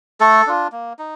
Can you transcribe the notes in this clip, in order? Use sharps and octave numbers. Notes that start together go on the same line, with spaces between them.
A3 A4
D4 F4
A#3
D#4